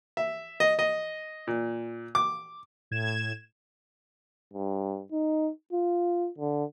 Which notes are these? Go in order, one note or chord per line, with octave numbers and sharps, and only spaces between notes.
E5
D#5
D#5
A#2
D6
A2 G#6 E7
G2
D#4
F4
D3